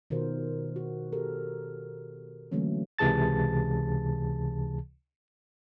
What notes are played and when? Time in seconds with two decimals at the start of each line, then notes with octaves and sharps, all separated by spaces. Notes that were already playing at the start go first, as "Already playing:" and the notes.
0.10 B2 D#3 F4 A#4 C5
0.76 F#4
1.12 G4 A4 A#4
2.52 D3 E3 F#3 A3 A#3 C#4
2.99 C#2 C3 E3 G#4 A5 A6